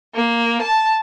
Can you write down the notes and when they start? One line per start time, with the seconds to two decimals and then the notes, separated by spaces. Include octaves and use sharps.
0.15 A#3
0.62 A5